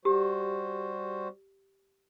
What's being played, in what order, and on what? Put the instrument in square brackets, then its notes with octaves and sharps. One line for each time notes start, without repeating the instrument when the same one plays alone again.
[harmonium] G3 F#4 C5 [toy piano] G4